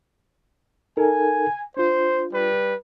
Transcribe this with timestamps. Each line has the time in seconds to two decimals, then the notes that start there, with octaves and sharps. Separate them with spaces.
0.97 D#4 A4 A#4 G#5
1.77 D4 F4 C5
2.33 G3 B4